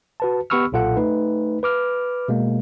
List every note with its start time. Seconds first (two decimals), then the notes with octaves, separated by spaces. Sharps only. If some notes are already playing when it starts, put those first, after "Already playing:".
0.20 F#4 B4 A5
0.50 B3 G4 B5 C#6 E6 F6
0.72 B1 A#2 F4 A4 F#5
0.97 A3 D#4 B4
1.63 B4 D6 F6
2.28 B2 G#3 A#3